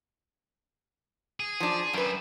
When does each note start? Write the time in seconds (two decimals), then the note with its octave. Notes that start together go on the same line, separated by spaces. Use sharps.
1.40 G#4
1.60 F3 D4
1.93 F#2 G3 E4 B4